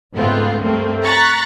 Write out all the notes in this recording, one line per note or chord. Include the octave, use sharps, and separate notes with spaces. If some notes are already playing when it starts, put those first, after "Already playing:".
C#2 G#2 A3 B3 C4 F4
G2 A3 A#3 C4
A#5 C#6 F#6 A6 B6